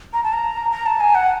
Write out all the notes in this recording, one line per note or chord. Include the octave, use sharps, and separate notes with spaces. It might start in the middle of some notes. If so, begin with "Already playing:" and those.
A#5
A5
A#5
A#5
A5
G#5
F#5